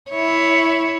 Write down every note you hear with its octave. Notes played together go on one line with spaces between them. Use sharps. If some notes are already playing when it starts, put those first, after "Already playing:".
E4 C#5